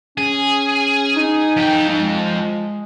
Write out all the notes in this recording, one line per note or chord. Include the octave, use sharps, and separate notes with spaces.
C#4 G#4
D#4
F3 G5
G#3